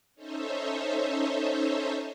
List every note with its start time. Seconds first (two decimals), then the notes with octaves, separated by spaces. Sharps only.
0.15 C#4 D#4 A4 C5 C#5 E5